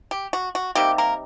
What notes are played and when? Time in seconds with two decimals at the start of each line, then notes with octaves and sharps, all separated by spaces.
0.11 G4
0.33 F#4
0.55 F#4
0.75 C3 G3 A#3 D#4 G4
0.98 A#3 A#4